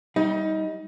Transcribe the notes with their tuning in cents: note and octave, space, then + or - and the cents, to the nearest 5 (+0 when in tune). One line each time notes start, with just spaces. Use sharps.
G3 -5 D#4 +25